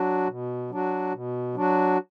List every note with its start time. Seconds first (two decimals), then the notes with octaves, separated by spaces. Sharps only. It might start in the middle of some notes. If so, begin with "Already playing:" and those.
Already playing: F#3 D4 F#4
0.28 B2
0.70 F#3 D4 F#4
1.13 B2
1.55 F#3 D4 F#4